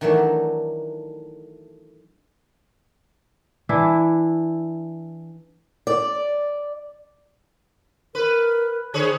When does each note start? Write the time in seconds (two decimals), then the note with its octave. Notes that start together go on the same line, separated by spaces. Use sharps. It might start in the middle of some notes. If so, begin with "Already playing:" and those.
0.01 D#3 E3 F#3 A3 D4
3.69 E3 D4 E4
5.87 D5
8.15 A#4 B4
8.94 D3 G#4 C5 C#5